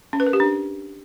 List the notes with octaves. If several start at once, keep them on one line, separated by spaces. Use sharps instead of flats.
C#4
B4
A#4
G4
D4